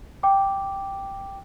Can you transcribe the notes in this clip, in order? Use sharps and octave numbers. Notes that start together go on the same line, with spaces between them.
G5 D6